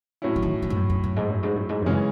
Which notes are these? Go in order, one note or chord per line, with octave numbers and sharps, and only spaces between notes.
A2 F#3 C#4 E4
E3
D#3
E3
G#2
F#2
F#2
F#2
G#2
F#2
G#2
F#2
G#2
F#2 C#3 E3 G#3 C#4